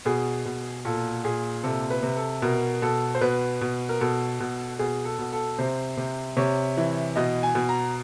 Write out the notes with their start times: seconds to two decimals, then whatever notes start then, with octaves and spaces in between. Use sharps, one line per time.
0.05 B2 G#4
0.45 B2
0.85 A#2 A4
1.24 A#2 G#4
1.63 C3 A4
1.90 B4
2.03 C3
2.16 A4
2.42 B2 A#4
2.82 B2 A4
3.15 C5
3.21 B2 B4
3.61 B2
3.89 A#4
4.00 B2 A4
4.40 B2
4.79 B2 G#4
5.05 A4
5.19 B2
5.33 A4
5.59 C3 C5
5.97 C3
6.37 C3 C#5
6.77 E3
7.16 B2 D#5
7.43 G#5
7.55 B2
7.69 A#5